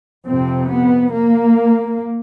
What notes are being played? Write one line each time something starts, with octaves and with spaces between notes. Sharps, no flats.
F2 C3 C4
B3
A#3